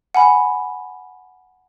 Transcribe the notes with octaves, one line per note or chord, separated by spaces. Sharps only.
F#5 G#5 B5